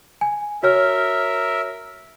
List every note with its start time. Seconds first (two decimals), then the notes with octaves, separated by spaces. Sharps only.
0.21 G#5
0.63 F#4 A#4 C#5 E5 F6